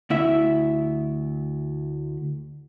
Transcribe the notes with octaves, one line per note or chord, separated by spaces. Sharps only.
D2 E4 E5